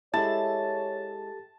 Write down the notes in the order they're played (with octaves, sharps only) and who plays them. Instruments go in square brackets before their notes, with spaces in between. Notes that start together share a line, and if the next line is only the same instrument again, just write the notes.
[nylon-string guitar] G#3 E4 [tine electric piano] G4 A4 [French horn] C#5 [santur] A5